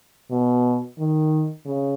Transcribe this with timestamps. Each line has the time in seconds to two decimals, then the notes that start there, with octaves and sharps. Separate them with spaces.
0.31 B2
0.99 D#3
1.66 C#3